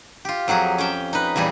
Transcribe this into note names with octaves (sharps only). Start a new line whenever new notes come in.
F4 G4
F2 F#3 G4 G#4 A#5
C#4 G4 G5 A5
D#4 B4
E2 A#2 G3 D#4 G#4